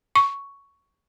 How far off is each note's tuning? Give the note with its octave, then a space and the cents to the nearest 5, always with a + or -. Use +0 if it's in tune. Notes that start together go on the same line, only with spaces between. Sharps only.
C#6 +5